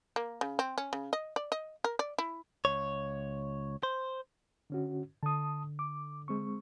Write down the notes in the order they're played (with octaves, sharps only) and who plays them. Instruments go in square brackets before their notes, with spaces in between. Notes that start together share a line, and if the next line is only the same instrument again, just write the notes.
[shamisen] A#3
C#3
C4
C#4
C#3
D#5
D5
D#5
A#4
D5
E4
[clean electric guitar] C#2 C#5
C5
[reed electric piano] D3 C#4 F#4
[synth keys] D3 [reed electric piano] A5 D#6
[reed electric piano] D6
G#3 C4 C#6